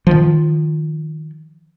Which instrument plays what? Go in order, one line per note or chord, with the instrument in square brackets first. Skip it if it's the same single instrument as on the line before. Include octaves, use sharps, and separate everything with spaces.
[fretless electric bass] D#3 F3